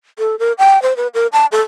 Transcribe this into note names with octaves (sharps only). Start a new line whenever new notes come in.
A4
A#4
G5
C5
B4
A#4
A5
A4